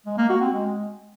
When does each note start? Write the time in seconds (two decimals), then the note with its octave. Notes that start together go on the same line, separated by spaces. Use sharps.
0.06 G#3
0.18 A#3
0.30 F#4
0.41 C4
0.53 G#3